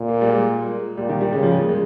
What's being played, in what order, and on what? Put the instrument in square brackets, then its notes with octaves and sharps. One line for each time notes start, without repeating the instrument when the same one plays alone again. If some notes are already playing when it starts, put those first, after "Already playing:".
Already playing: [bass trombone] A#2
[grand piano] A#3
G3
G#3
[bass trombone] A#2 [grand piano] G3
[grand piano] D#3
G3
[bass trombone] C#3 [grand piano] G#3
[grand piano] F3
G#3
A#3
G#3